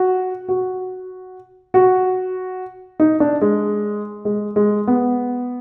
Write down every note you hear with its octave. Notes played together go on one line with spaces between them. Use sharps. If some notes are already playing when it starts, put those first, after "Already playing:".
Already playing: F#4
F#4
F#4
D#4
D4
G#3
G#3
G#3
B3